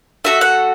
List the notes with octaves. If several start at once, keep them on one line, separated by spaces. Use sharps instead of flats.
A3 F#4 A4 E5
F#5